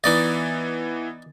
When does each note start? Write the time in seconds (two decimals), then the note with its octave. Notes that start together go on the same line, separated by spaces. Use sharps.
0.04 E3 B3 D#4 D5 D#5 A6